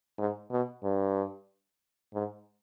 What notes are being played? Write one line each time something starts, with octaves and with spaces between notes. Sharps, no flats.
G#2
B2
G2
G#2